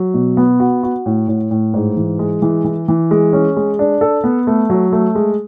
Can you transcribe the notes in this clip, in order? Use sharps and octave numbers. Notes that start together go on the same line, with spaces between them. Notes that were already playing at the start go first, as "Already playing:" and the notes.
Already playing: F#3
B2
B3
F#4
F#4
A2
A2
A2
G#2
E3
G#3
E3
E3
E3
G#3
C#4
G#3
D4
A4
B3
A3
F#3
A3
G#3